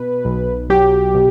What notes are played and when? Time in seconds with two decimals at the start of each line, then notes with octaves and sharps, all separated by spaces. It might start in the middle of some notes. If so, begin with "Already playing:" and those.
Already playing: B2 B4
0.25 B1
0.70 F#3 G4
1.14 B2